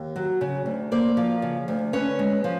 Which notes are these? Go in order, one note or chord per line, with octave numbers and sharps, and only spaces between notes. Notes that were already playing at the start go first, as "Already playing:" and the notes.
Already playing: D#2
F#3
C#3
D2
A#3 C5 D5
F3
C#3
D2
C#4 B4 C#5
G#3
F3